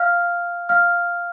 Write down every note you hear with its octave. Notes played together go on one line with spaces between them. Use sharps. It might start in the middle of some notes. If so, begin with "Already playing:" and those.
Already playing: F5 F6
F5 F6